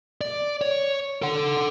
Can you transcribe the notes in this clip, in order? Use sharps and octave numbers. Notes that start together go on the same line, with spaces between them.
D5
C#5
A4 F#5